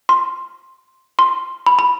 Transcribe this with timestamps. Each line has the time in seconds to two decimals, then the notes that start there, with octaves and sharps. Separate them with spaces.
0.09 C6
1.19 C6
1.66 B5
1.79 B5